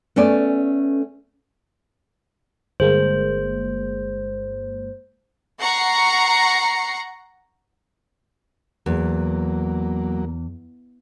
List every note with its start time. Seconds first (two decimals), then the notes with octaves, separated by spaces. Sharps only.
0.16 A3 B3 C#4 A4 D5
2.80 G1 G#3 A#3 C5
5.60 F#5 A#5 C#6 C7
8.86 E2 F#3 A#3